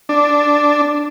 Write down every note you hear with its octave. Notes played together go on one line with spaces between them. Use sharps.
D4